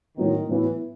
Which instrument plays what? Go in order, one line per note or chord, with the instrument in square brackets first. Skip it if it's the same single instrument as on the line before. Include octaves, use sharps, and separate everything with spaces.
[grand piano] A2 F#3 B3 [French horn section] D#3
[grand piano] A2 F#3 B3 [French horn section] E3